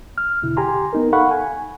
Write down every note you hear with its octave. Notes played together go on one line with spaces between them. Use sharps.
F6
E2 B2 D3 E4
G4 G#5 A#5 C6
B3 D#4 A#4
A4 F5 F#5 B5 C#6
G#5